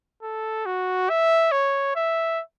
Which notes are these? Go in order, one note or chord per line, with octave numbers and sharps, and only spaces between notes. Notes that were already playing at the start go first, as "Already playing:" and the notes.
A4
F#4
E5
C#5
E5